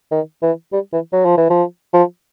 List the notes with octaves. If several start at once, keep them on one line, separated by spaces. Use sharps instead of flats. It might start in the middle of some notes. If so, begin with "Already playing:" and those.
D#3
E3
G3
E3
F#3
F3
E3
F3
F3